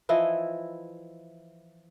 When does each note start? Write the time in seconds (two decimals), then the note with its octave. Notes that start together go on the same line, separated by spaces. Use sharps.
0.09 E3 F3 E4 D#5